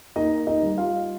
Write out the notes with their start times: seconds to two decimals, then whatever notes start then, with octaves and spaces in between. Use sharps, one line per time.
0.16 A#3 D#4 D#5
0.47 D#4 D#5
0.63 G3
0.78 F4 F5